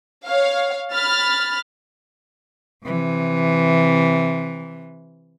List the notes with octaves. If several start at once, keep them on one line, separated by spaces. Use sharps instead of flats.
C#5 F5
B5 F6 A6
C3 E3